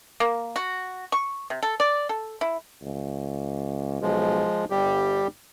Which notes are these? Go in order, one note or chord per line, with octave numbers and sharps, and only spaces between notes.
A#3
F#4
C#6
C3
A4
D5
A4
E4
C#2
B1 F3 G#3
G1 G3 G4